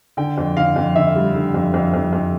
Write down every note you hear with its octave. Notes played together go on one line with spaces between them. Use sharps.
D3 G5
F2
D3 F5
F2
D3 E5
G3
D3
F2
F2
F2
F2